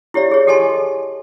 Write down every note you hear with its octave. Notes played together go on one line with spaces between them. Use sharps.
E4 G4 C#5 D5 E5
G#4 C#5
G4 A4 D#5 G#5 A5 C6